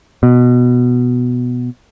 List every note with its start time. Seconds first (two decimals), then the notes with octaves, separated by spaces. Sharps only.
0.23 B2